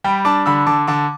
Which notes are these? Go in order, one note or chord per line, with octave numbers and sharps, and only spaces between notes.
G3 G5 B5
D4 A5 D6
D3 B5 E6
D3 A5 D6
D3 A5 D6